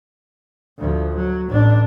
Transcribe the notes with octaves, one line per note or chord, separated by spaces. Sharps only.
D2 F3
F#3
A1 D4